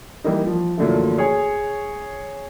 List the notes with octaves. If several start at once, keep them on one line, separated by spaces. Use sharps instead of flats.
E3 G3 A#3 D#4
F3
F#2 A#2 D3 E3 F3 A3
G#4 C#5